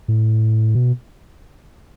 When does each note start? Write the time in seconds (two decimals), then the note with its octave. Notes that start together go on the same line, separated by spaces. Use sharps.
0.08 A2
0.75 B2